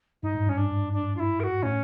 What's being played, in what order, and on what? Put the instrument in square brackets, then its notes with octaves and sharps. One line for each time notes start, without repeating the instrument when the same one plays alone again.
[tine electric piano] G2 [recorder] D#4
[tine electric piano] G#2
[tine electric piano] G2 [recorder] C#4
[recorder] D4
D4
F4
E4
A#4
F#4
[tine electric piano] A2 [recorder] C#4